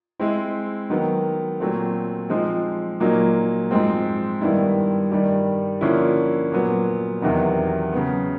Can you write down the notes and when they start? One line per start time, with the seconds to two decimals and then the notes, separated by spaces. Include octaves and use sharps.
0.19 G#3 C4 E4
0.90 D#3 F#3 B3
1.60 A#2 F#3 A3 C4
2.30 F3 G#3 C4 D#4
3.00 A#2 F#3 A#3 D#4
3.71 G#2 F3 G#3 C4
4.41 G2 D#3 G3 B3 E4
5.12 G2 D#3 G3
5.81 D3 F3 A#3 C#4 E4
6.52 A#2 F#3 B3
7.22 E2 C3 D#3 F#3 B3
7.93 C#3 F#3 B3